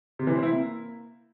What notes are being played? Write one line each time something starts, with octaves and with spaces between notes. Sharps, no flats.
C3
E3
C4
E4
A#3